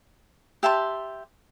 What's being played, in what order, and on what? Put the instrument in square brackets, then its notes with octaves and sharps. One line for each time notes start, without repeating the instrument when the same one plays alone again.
[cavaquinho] G4 E5 A5 C6